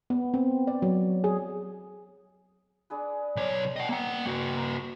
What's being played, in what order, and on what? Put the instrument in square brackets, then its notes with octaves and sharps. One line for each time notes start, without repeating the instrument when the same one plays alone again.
[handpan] B3
C4
D5
F#3
G#4
[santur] D4 G#4 B4
[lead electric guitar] B1 C#5 [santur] D5
[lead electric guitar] D#5 F#5 [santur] G5
[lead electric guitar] A#3 F#5 [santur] A#5 E6
[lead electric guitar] A#3 F#4
[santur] A#5